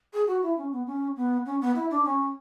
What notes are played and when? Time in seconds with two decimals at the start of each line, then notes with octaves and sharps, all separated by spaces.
0.13 G#4
0.28 F#4
0.43 E4
0.58 C#4
0.73 B3
0.87 C#4
1.17 B3
1.46 C#4
1.61 B3
1.76 E4
1.91 D4
2.05 C#4